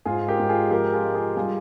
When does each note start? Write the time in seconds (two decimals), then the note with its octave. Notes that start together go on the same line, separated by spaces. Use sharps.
0.05 G#2 F4 G#4
0.28 G4 A#4
0.39 G#2
0.49 F4 G#4
0.71 F3 G4 A#4
0.93 F4 G#4
1.04 G#3
1.15 F4 G#4
1.37 G3 F4 G#4